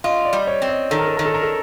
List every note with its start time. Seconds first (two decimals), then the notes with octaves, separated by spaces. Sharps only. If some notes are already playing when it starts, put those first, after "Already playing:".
0.04 F4 D#5
0.25 D5
0.33 G3
0.47 C#5
0.62 C4
0.69 D#5
0.91 D#3 A4
0.99 A#4
1.08 A4
1.17 D#3 A#4
1.25 A4
1.34 A#4
1.43 A4